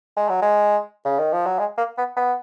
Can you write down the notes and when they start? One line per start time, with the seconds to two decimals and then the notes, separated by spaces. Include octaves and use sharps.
0.17 G#3
0.29 F#3
0.42 G#3
1.05 C#3
1.19 D#3
1.33 F3
1.46 F#3
1.59 G#3
1.78 A#3
1.98 B3
2.16 B3